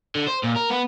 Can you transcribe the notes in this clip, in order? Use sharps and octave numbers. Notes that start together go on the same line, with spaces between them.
D3
C5
A#2
A#4
B3